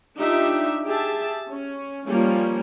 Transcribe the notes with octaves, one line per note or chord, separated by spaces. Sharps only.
D4 D#4 F4 G4 E5
G4 G#4 E5 A5
C#4
F3 G3 A#3 C#4